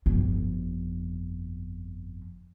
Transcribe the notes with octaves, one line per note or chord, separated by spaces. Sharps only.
G1 F2